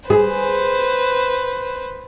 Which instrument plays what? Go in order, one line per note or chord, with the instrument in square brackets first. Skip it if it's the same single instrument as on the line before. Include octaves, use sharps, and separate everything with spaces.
[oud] G#4 [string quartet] B4 C5